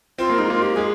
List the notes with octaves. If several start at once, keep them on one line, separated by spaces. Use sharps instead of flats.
C4 F4
A#3
G#3 D#4
A#3 F4
G4
G#3 G#4